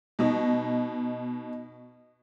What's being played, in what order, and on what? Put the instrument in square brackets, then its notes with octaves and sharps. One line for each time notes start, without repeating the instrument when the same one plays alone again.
[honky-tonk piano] B2 D#4